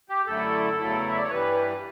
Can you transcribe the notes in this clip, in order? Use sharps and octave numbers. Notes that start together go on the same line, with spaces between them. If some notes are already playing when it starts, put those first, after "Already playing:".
G4
F#2 D3 A3 E4 A4
E2 C#3 F#3 A3 E4
E5
D5
C#5
G2 E3 G3 B4